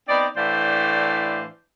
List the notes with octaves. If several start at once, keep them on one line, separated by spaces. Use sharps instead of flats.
B3 C4 D#4 D5
A2 E3 D4 C5 D5 F5